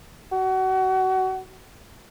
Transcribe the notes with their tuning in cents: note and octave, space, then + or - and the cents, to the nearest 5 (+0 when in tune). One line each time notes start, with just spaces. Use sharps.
F#4 +30